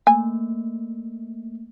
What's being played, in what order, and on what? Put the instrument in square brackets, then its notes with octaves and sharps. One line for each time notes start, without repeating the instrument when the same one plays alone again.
[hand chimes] A3 A#3 [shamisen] G#5